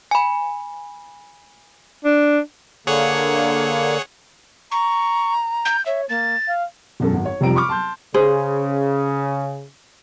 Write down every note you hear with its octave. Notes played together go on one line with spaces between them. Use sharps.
G#5 B5
D4
D3 A#3 G#4 C#5 F#5
A#5 C#6
G6
C#5 E5
A#3 A6
F5
E1 F#2 A4
G#1
C#5
F1 C3 F3 G3 A#5 D7
B5 C#6 D6 F6
A5 C6 G6
C#3 G#4 C5